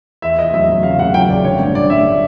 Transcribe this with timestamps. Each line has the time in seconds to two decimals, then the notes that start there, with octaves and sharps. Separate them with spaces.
0.22 E2 E5
0.38 E2 D#5
0.53 F#3 E5
0.69 F#3
0.83 C#3 F5
0.98 F#3 F#5
1.14 F#3 G5
1.29 F#1 D5
1.44 D3 C#5
1.59 G2
1.75 D3 D5
1.90 G2 E5